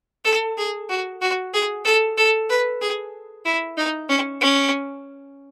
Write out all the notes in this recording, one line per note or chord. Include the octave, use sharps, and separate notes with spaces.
A4
G#4
F#4
F#4
G#4
A4
A4
B4
G#4
E4
D#4
C#4
C#4